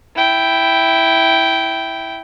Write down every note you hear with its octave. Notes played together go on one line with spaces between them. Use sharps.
E4 G5